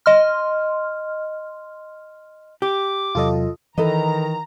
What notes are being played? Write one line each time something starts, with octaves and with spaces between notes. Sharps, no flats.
D#5 C6 F6
G4 D6
E2 C3 F#3 F4 A4 D#5
D#3 E3 A4 B4 D#5 A#5